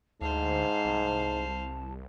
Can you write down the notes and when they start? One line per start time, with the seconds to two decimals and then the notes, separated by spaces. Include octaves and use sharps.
0.21 D2 G#2 C5 F5 A5
0.85 C2